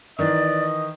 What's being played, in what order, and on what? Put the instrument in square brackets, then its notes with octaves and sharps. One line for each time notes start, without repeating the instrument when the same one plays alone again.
[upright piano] D#3 E3 [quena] D5 [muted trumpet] D#5